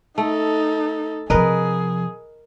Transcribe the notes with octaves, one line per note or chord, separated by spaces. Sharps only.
A3 D#4 A4
C3 F3 G#4 A#4 B4 D#5